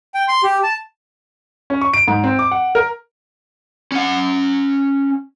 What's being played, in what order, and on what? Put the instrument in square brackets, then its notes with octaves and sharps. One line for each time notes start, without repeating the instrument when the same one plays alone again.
[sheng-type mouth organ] G5
C6
G4
A5
[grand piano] C#4
C#6
D7
G#2
C4
D6
F#5
A#4
[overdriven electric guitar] C#4 F#5